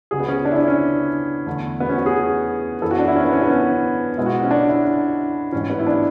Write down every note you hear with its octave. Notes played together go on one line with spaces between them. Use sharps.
C#2 C#3 F#3 G#4
B3
C#4
D4
E4
D4
C#4
E2 D3 A3
B3
C#4
F#4
G#4
F#2 E3 B3 A4
F#4
D4
E4
C#4
B3
C#4
B3
C#4
B1 B2 G#3 B3 E4
F#4
C#4
D4
E4
E4
A1 G#2 E3 C#4
B3
E4
D4